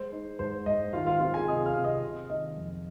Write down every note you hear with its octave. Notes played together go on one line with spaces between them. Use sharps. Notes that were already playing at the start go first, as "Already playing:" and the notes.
Already playing: G#3 C5
D#4
G#2 C5
G#2 D#5
D#3 F4 F5
F4 F5
C4 F4 F5
G#4 G#5
C3 D#5 D#6
F5 F6
C3
D#5 D#6
C3
D#3 D#5
F2